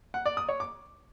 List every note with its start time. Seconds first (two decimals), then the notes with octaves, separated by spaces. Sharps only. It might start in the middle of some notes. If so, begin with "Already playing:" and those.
0.14 F#5
0.26 D5
0.37 D#6
0.49 C#5
0.60 D6